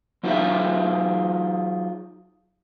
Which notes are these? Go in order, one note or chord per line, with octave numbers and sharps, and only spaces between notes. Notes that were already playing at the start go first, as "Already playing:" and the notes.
F#3 D#4 F4 F#4 G#4 E5